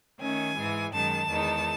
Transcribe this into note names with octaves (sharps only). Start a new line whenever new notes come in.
D#3 A3 C#4 G#5
G#2 E3 G#3
F#2 D#3 G#3 A5
E2 D#3 G#3 D#4